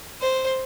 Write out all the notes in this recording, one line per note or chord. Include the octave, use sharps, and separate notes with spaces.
C5